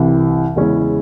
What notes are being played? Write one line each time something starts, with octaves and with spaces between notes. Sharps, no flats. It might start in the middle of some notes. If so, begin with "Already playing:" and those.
Already playing: C2 C3 E3
E2 C#3 G#3 C#4 E4